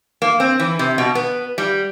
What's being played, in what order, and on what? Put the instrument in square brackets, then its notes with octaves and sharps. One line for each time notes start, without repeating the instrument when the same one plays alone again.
[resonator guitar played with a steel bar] A#3
C4
E3
C3
B2
B3
G3